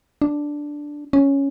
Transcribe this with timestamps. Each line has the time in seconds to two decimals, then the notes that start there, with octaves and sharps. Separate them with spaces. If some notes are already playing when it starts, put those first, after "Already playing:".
0.22 D4
1.13 C#4